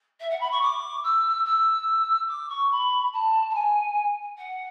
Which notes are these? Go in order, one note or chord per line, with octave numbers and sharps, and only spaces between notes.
E5
F#5
B5
C#6
D6
E6
E6
D6
C#6
B5
A5
A5
G#5
F#5